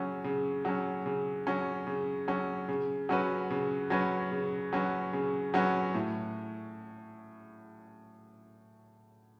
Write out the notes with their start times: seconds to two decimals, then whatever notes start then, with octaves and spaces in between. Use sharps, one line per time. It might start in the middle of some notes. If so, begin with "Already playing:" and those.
Already playing: C#3 F#3 C#4
0.24 C#3
0.65 F#3 C#4
1.06 C#3
1.47 F#3 C#4
1.87 C#3
2.28 F#3 C#4
2.69 C#3
3.09 F#3 C#4 F#4 B4
3.50 C#3
3.90 F#3 C#4 F#4 B4
4.32 C#3
4.73 F#3 C#4 F#4 B4
5.13 C#3
5.54 F#3 C#4 F#4 B4
5.94 A2